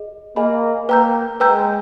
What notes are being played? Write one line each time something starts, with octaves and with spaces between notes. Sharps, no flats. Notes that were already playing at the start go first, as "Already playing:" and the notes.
Already playing: G#4 D#5
A#3 G#4 D#5 G#5 B5
A#3 B4 G5 A#5 E6 G6
G#3 B4 G5 A#5 E6 G6